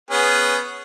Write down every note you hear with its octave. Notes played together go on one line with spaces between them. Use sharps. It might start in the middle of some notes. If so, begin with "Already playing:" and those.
B3 C#4 G#4